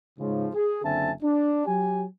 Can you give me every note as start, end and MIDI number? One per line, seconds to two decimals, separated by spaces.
0.19 0.49 44
0.19 0.49 49
0.19 0.49 53
0.55 0.81 68
0.84 1.12 30
0.84 1.12 50
0.84 1.12 60
0.84 1.12 76
0.84 1.12 80
0.84 1.12 81
1.22 1.64 62
1.66 2.05 54
1.66 2.05 67
1.66 2.05 80